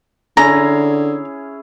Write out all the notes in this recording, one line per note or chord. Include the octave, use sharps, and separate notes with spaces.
D3 C#4 E4 G#4 A#5